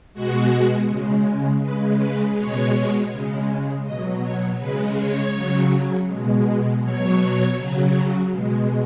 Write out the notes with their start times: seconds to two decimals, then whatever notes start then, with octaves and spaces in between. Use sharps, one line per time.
0.14 B2 G#3 F#4
0.88 C#3 G#3
1.62 C#3 G#3 B4
2.00 B4
2.37 B2 G#3 C#5
3.11 C#3 G#3
3.84 B2 F#3 D#5
4.22 C#5
4.59 C#3 G#3 B4
4.97 C#5
5.34 C#3 F#3
6.08 B2 G#3
6.82 B2 F#3 C#5
7.57 C#3 F#3
8.31 B2 G#3